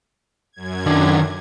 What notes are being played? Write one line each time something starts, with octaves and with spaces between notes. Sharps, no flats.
F#2 G#6
D#3 D4